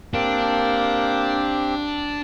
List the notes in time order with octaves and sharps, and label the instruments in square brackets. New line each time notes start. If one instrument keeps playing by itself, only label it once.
[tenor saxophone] A#3 [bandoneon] C4 G4 [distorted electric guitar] D4